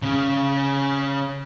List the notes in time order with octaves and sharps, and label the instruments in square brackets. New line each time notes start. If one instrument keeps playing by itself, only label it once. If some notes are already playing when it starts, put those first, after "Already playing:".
[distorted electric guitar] C#3 C#4